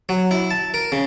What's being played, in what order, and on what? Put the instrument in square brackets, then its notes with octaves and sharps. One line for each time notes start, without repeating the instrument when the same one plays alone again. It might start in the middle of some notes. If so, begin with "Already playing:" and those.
[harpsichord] F#3
E4
A5
A#4
C#3